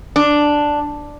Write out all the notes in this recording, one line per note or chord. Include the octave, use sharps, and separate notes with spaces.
D4